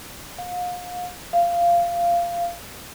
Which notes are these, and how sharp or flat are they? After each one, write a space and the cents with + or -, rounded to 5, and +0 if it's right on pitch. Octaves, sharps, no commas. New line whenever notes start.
F5 +40
F5 -15